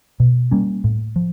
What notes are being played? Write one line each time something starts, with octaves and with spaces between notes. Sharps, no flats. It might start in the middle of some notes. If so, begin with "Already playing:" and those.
B2
G3 A#3 C#4
A2
F3